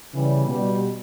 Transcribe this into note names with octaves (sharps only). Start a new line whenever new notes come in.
C#3 E3 G3
B2 G3